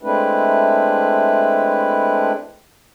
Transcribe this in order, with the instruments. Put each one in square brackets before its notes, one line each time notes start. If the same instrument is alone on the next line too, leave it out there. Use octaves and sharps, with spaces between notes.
[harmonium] G#3 A3 C4 D4 E4 B4